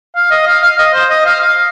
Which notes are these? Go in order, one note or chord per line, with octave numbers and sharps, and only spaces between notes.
F5
D#5
F5
F5
D#5
C5
D#5
F5
F5